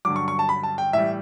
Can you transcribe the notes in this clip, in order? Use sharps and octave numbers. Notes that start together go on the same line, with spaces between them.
G2 D3 F#3 D6
C#6
C#6
A5
B5
A5
G5
A2 E3 G3 E5